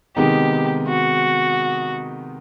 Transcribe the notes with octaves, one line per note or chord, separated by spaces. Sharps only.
C3 D#3 G#3 B3 D#4 G4
F#4